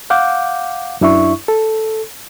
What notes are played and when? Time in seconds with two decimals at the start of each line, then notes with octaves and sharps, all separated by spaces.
0.10 F5 F#5 D6 G6
1.01 F#2 D4 E4 E5 C#6
1.48 A4